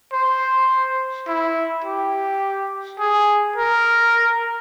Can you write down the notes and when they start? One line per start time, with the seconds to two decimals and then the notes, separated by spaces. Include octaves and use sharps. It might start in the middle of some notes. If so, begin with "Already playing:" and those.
0.13 C5
1.27 E4
1.84 G4
2.99 G#4
3.56 A#4